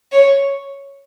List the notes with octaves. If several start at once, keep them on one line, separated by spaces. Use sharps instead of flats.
C#5